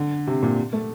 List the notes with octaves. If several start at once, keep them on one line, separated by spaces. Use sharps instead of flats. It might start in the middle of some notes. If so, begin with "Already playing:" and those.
Already playing: D3
C3
A#2
A3